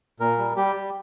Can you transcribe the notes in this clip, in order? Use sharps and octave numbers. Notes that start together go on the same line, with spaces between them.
A#2 A#4
G3
G3 G4
G3